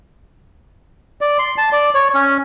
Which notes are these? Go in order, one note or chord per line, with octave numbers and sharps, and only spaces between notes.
D5
C6
A5
D5
C#5
C#4